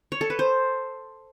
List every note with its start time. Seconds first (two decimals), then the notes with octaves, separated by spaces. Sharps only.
0.12 C#5
0.21 A4
0.30 B4
0.39 C5